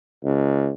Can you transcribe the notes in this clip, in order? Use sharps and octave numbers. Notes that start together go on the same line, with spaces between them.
C#2